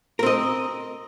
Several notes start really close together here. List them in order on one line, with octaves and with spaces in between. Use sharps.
A#4 C4 D#5